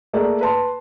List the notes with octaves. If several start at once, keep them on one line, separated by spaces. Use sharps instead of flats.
A3 A#3 G#4 D5
B4 A5 C6